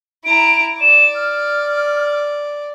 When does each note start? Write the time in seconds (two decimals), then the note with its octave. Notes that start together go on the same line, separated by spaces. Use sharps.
0.25 E4 A#5 D7
0.80 D5 E7
1.15 F6